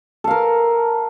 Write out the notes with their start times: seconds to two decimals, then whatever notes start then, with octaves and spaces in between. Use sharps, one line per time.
0.24 A4
0.27 F5
0.31 A#4